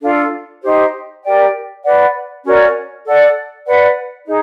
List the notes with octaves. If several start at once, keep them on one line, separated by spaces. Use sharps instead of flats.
D4 F4 A4
D#4 G4 C5
G4 A#4 D5 G5
B4 D5 F#5
C#4 F#4 A#4 D5
A4 D5 F#5
B4 D5 F#5
D#4 G#4